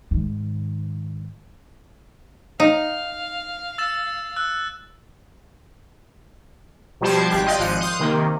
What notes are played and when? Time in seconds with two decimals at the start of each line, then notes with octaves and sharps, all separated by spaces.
0.11 G#2 D#3
2.60 D#4 F5
3.78 E6 A6 E7
4.36 E6 F#6
7.01 B2 F3 G3 C5 A5 G#6
7.29 G#1 G4 F#6
7.46 D5 D#5 F5 G5 C6 D#6
7.59 G#1 F3 F#6 C#7 D#7
7.80 F5 C6 D#6 F#6 G6
7.99 C3 D#3 A#3